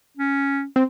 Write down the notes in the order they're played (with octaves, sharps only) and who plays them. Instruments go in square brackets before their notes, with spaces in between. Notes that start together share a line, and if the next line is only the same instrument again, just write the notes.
[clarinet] C#4
[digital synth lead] C4